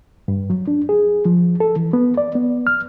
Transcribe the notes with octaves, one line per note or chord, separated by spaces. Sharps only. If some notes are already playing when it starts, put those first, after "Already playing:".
G2
F#3
D4
G#4
F3
A4
E3
B3
D5
B3
F6